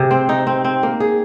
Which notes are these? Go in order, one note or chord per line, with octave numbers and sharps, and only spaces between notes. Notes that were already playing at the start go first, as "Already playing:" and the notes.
Already playing: C3 G#4
C4
D#4
C4
C4
A#3
G#4